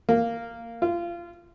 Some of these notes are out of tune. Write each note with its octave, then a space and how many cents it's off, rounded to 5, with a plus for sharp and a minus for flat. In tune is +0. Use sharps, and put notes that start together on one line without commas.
A#3 -10
F4 -25